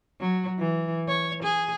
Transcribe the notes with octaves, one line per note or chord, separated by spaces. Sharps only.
F#3
E3
C#5
G#4